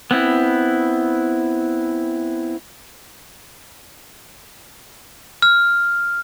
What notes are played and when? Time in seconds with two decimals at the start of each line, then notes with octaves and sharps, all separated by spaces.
0.11 B3 C4 E4
5.42 F6